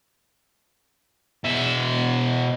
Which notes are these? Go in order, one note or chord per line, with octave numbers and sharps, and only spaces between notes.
B2 E5